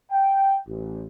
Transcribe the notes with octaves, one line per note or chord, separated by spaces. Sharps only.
G5
A1